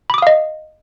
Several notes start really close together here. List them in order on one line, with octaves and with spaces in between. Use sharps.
B5 D6 D#6 F5 D#5